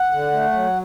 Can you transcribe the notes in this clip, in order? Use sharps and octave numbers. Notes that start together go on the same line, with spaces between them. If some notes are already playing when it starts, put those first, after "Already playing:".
Already playing: F#5
D3
A3
F#3